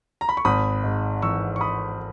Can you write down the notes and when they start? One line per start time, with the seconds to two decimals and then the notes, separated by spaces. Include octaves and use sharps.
0.21 A#5
0.29 B5
0.37 C#6
0.45 G#1 B5 D#6
0.84 G#2
1.22 E3 C#6 E6
1.56 C#6
1.61 B5 D#6